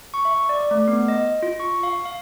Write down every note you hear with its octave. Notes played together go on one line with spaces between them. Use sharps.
C#6
E5
D5
A3
B3
D#5
F4
C#6
F5
F5